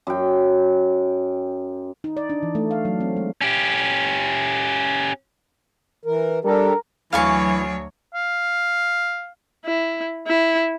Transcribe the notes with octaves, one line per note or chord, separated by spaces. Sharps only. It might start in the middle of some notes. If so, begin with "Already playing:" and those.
F#2 G5
D#4
D5
D4
E3
A3
F5
F#3
C4
G#3
C#4 G4
E3 A#4
G3 D4 G4 A4 A#4
D2 E3 F#3 C#5 F5 G#5 C#6
F5
E4
E4